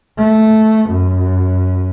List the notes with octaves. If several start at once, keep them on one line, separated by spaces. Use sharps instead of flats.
A3
F#2